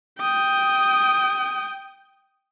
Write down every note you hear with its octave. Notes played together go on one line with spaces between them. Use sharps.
G5 D#6